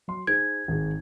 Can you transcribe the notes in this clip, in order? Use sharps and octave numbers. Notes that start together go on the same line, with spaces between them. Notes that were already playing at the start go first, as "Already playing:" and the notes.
F#3 C6
D#4 G#4 C5 G#6
G#1 G#4